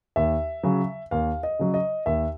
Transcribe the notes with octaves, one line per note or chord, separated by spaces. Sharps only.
D#2 E5
C#3 F#3
D#2 F5
D#5
C#3 F#3
D#5
D#2 E5